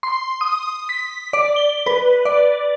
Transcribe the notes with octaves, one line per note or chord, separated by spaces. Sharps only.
C6
D#6
B6
D5
G7
B4
D5